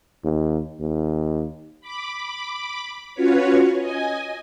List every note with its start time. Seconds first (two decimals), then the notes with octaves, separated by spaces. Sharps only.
0.24 D#2
0.80 D#2
1.81 B5 D6
3.14 C#4 F4 F#4 B4 C#5
3.79 D#5 G#5